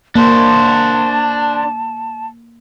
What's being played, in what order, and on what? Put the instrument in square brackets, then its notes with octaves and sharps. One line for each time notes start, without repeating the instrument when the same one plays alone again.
[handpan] A#3 [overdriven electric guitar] D4 C5 [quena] A5